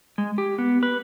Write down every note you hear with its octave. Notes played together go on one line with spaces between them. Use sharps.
G#3
G4
B3
B4